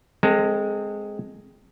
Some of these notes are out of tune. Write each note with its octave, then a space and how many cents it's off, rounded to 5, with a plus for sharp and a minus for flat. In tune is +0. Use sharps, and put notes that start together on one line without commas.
G#3 +0 C4 +0 A4 +35